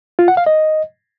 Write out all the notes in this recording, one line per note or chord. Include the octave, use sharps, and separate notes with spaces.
F4
F#5
F5
D#5